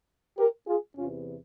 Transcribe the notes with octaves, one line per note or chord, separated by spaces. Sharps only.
G4 A#4
F4 G#4
E2 C3 E3 C#4 F4